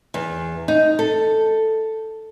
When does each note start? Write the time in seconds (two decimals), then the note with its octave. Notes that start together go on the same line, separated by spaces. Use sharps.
0.14 E2
0.68 D#4
0.99 A4